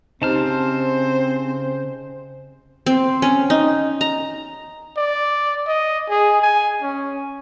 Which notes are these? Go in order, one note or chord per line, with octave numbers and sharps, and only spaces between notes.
C#3 C4 D#4 G4 C5 A5 F6
C4
C#4
D#4
A#5
D5
D#5
G#4
G#5
C#4